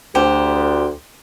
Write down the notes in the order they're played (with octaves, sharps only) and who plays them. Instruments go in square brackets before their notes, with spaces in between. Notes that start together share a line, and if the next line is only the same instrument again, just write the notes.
[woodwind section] D2 [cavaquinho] G4 C5